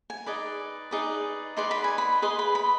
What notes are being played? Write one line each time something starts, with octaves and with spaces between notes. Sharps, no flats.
G#5
D#4 G#4 B4 D5
D#4 G#4 B4 D5
D#4 G#4 B4 D5 C6
B5
G#5
B5
G#4 B4 D#5 C6
B5
B5